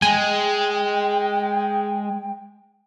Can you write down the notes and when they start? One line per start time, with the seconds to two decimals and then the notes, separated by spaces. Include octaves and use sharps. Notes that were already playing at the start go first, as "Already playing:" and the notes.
0.02 G#3 G5 G#5